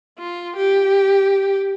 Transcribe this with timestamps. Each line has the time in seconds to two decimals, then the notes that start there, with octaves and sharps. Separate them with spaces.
0.19 F4
0.56 G4